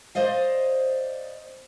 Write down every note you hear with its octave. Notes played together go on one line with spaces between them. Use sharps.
C5 D5 D#5 F5